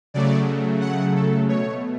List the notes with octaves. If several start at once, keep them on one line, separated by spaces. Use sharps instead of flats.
C#3 F#3 A3 D5
F#5
A4
B2 A3 C#5